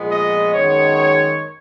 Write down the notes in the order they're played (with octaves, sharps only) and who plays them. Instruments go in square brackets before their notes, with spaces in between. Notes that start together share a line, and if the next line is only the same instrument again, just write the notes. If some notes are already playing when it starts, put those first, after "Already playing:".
Already playing: [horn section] A#2 F3 G#3 B3
D#5
F#2 D#3 G#3 B3 C#5